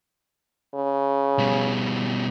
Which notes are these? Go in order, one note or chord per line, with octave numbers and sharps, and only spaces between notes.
C#3
B2 G3